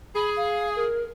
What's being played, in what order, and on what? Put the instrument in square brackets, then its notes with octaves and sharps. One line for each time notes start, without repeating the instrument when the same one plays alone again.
[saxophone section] G#4 [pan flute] B5
[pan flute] F5
A#4